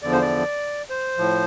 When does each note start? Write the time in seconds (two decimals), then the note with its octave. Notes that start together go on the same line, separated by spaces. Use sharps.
0.03 E2 D3 F3 D5
0.12 C5
0.22 D5
0.90 C5
1.18 A2 F3